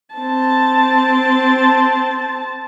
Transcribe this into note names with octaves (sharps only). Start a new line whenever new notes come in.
C4 A5